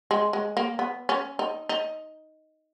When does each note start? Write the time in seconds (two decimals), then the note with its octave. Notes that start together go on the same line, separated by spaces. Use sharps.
0.11 G#3
0.33 G#3
0.57 A#3
0.79 B3
1.09 C#4
1.39 D#4
1.69 D#4